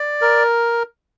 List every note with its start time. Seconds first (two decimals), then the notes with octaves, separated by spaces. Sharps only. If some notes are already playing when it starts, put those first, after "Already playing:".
Already playing: D5
0.22 A#4